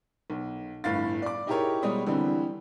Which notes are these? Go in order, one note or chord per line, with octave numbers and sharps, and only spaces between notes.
B1
G1 A2 F5 A6
D5 D6
D#4 E4 G4 G#4 A#4 C#5
B2 G3 G#3 C#5 D#6
D3 E3 G3 C4